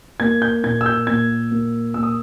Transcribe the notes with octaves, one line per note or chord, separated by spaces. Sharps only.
A#3 G#6
G6
A#2 G#6
E6
G6
A#2 G#6
A#3
A#3 E6
D#6